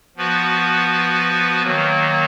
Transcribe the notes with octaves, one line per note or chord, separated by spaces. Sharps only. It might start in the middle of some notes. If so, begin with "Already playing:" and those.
F3 B3 F#4 B4
D#3 F#3 A#3